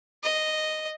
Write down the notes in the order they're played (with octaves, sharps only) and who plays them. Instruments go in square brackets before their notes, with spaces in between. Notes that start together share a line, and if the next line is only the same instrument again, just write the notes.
[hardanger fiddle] D#5